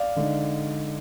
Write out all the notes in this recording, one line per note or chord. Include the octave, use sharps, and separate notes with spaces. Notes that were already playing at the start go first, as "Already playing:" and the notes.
Already playing: D5 F5
D3 G#3 D#4